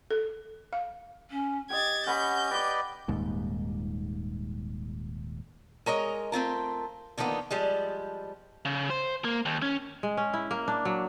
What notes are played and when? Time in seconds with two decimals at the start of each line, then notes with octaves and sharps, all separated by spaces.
0.11 A4
0.73 F5
1.30 C#4
1.70 G4 D#5 G5 G#6 A6
2.06 C#4 D#5 F#5 B5 G6
2.51 B4 D5 D#5 G5 D6
3.08 D#1 D#2 G#2
5.86 G#3 A#4 C#5 D#5
6.32 A3 C4 F4 A#4
7.17 D3 D#3 F3 A#3 B3
7.51 F3 G3 G#3
8.65 C#3
8.90 C5
9.25 A#3
9.45 D#2
9.62 C#4
10.03 G#3
10.17 C#4
10.34 E4
10.51 A#3
10.68 D4
10.85 F#3